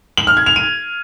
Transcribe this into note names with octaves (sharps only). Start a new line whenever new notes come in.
F#7
F6
G#6
F7
D#7